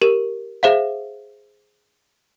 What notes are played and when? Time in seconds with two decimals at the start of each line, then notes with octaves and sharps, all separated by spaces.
0.02 G4 A#4 E7
0.63 G#4 C5 E5 F5